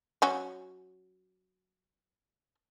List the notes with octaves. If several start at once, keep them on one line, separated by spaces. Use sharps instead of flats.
F#3 C#4 F#4